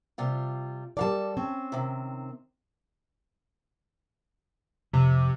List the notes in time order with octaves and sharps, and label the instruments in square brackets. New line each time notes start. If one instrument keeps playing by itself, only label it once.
[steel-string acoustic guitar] C3 G3 F4
[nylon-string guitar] G3 A#4 D5 [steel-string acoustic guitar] A4 F5 A5
[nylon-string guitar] C4 C#4
[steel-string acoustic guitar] C3 D#3
[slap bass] F2 [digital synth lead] C3